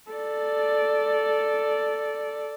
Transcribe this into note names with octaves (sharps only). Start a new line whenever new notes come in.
A4 D5